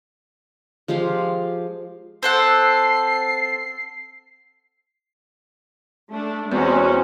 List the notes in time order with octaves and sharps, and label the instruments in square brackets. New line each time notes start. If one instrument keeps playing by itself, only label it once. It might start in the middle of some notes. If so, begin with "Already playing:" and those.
[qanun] F3 G#3 G4 F5
[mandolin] C4 A4 F#5 [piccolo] C7
[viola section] A3 D4
[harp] E2 [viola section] G#3 C#4 F#4 [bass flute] C4